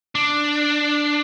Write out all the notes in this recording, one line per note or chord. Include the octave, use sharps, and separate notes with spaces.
D4